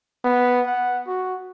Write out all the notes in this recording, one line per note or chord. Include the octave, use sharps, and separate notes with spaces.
B3
F#5
F#4